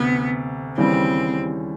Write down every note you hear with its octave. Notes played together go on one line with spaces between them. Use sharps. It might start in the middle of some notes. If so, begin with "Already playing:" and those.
Already playing: D2 C3 B3
D#2 C#3 E3 G3 C4